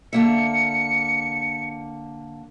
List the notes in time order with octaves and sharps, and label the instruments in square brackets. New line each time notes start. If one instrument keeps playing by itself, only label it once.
[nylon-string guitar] D3 A#3 E5 [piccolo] C#7